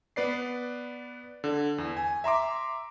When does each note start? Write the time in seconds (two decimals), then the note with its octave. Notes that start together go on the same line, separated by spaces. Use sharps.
0.16 B3 B4 D5 C7
1.44 D3
1.78 E2
1.97 G#5
2.24 E5 A#5 C6 D6